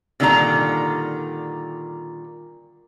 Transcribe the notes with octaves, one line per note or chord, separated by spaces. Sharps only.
A#2 D3 D#3 G3 D4 A#5